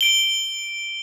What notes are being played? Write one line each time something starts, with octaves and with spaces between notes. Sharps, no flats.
D7 G7